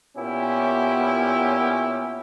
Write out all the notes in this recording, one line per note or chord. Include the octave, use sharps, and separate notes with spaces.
A#2 B3 C#4 E4 G4